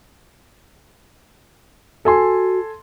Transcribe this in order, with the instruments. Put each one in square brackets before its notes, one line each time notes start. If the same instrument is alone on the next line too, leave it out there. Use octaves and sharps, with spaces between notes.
[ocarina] F#4 [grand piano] A4 G#5 C6